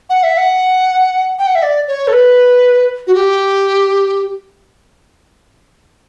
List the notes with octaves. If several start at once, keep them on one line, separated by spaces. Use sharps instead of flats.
F#5
E5
F#5
G5
F#5
E5
D5
C#5
A4
B4
F#4
G4